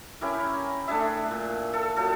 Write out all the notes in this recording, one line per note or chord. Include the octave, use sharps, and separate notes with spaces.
C#4 E4 G4 A#4
A3 D4 G#4 E5
A#2
A4
A#2 F#3 A4